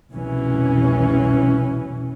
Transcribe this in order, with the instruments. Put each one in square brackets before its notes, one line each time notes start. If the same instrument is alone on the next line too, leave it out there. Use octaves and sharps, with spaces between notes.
[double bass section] F1 C2 B2 E3 C#4